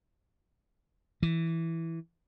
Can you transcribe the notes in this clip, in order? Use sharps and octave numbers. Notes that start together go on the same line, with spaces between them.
E3